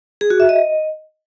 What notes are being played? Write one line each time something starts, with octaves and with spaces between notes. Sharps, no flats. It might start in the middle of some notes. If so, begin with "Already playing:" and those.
G#4
F#4
E5
D#5